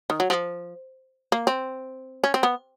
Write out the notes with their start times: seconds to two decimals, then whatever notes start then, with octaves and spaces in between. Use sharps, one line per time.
0.10 D#3
0.20 F#3
0.30 F3
1.32 A#3
1.47 C4
2.24 C#4
2.34 C4
2.43 B3